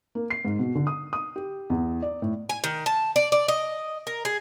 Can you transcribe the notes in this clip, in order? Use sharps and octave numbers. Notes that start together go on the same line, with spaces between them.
A#3
C7
G#2
B2
D3
D#6
D#6
G4
E2
D5
A2
G#5
D#3
A5
D5
D5
D#5
A#4
G#4